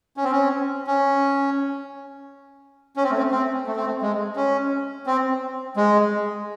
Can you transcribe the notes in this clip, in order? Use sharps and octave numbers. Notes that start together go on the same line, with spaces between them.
C#4
C4
C#4
C#4
C#4
C4
A3
C4
C4
A3
C4
A3
G#3
C#4
C4
G#3